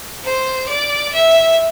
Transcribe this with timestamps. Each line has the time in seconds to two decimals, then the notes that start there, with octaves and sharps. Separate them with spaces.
0.25 C5
0.69 D5
1.13 E5